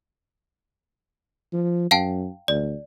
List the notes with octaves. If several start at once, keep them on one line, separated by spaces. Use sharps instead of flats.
F3
F#2 F5 G5 A5
D2 D5